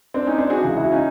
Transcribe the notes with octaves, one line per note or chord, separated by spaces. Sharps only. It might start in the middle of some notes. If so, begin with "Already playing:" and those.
C4 D4
C#4 D#4
C4 D4
F#4 G#4
C#2 C#3 E3
E4 F#4
C#4 D#4